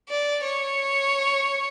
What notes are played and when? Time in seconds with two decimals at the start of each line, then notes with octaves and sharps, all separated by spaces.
0.09 D5
0.43 C#5